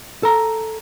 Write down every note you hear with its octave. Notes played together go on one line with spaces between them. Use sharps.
A4 A#5